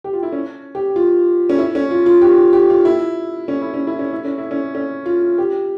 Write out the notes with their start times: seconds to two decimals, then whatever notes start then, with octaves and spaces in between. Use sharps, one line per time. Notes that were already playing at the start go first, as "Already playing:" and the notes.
0.04 G4
0.13 F4
0.23 E4
0.32 C#4
0.75 G4
0.96 F4
1.50 C#4
1.58 E4
1.75 C#4
1.91 F4
2.06 F4
2.22 G4
2.53 G4
2.70 F4
2.85 E4
3.48 C#4
3.62 E4
3.74 C#4
3.87 E4
3.99 C#4
4.13 E4
4.25 C#4
4.38 E4
4.51 C#4
4.75 C#4
5.06 F4
5.38 G4